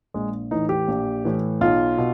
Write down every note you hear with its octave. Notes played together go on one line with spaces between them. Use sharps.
A#1 G#3
A2 E3 D#4
G4
A#1
A2 E3
B1 F4
B2